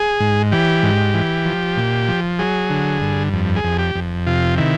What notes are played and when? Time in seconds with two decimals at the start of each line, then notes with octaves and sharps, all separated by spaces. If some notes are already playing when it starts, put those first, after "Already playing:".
Already playing: G#4
0.20 G#2
0.52 E3 G4
0.83 G#2
1.14 E3
1.45 F3
1.77 A#2
2.08 F3
2.39 F#3 G#4
2.70 D3
3.01 G2
3.33 F2
3.56 G#4
3.64 F2
3.79 G4
3.95 F2
4.27 C3 F4
4.57 D#3 E4